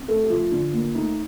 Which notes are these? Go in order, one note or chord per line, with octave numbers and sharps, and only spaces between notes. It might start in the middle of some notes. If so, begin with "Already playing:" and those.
Already playing: C4
A3 A4
G4
F3 F4
D3
A#3
A3 D#4